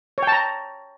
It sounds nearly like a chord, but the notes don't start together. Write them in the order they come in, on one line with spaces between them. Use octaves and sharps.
C#5 G5 A5 A#5